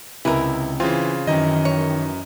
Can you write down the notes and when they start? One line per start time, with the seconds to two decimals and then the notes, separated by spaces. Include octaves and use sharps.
0.25 C#2 C3 E3 E4 A#4
0.80 C#3 E3 C4 F4
1.27 F#2 D#3 E3 D#5
1.65 C#5